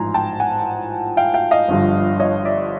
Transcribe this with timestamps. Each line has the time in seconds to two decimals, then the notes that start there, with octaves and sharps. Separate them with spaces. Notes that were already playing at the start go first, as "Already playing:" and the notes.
Already playing: A1 G#2 F3 G#5 A#5 C6
0.14 G5 A5
0.40 F#5 G#5
1.17 F5 G5
1.34 F5 G5
1.51 D#5 F5
1.68 G1 G2 D3 F3
2.20 C#5 D#5
2.45 D5 E5